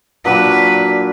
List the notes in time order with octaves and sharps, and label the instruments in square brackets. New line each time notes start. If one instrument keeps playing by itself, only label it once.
[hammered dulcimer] A#2 F#3 D4 [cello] B4